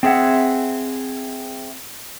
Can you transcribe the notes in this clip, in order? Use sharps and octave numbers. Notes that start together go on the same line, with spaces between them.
C4 G#4 E5 F#5